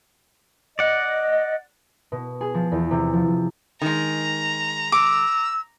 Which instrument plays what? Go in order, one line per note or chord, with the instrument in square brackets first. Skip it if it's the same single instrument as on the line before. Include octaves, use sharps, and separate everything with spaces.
[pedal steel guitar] D5 F#5 [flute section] D#5
[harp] B2
G#4
F3
E2
C3
F3
F3
[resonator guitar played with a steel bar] D#3 G#3 [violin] A#5
[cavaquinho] D6 [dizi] E6